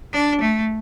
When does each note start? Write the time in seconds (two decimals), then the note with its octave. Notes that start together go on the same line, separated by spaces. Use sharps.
0.13 D4
0.41 A3